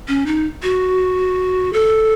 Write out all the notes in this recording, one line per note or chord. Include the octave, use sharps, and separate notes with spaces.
C#4
D#4
F#4
A4